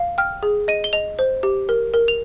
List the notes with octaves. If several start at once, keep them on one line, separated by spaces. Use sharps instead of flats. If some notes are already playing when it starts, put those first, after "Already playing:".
Already playing: F5
G5 F6
G#4
D#5 D#7
G7
D#5 F7
C5
G4
A#4
A#4
F7